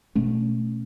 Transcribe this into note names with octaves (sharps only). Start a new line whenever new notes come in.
B2 A3 C#4